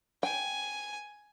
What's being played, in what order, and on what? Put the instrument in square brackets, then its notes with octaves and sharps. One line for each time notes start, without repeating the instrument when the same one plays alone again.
[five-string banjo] G5 [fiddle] G#5